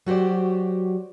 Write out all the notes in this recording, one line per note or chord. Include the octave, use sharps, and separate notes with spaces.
F#3 F#4 G4 C5 D5